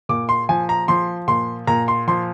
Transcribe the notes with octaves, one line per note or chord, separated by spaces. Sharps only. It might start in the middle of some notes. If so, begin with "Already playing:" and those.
A#2 D6
C6
F3 G#5
A#5
F3 C6
A#2 C6
A#2 A#5
C6
F3 C6